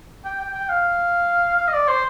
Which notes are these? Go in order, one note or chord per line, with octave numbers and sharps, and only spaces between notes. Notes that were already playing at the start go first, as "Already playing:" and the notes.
G5
G5
G5
F5
F5
D#5
D5
C5